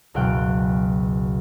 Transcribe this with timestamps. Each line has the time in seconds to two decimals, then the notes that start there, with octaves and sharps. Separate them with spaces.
0.14 F#1 C#2 B2 F5 G5 F#6